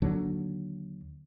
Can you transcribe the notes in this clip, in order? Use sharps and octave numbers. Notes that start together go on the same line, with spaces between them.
D#2 D3 F#3 D4